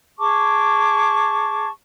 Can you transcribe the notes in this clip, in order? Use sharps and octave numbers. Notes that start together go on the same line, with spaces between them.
G#4 A5 C#6 D6